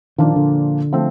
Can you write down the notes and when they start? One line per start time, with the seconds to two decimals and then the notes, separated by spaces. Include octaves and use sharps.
0.18 A#2 D#3 F3 A#3 D4 F4
0.36 D3
0.92 F3 A3 C4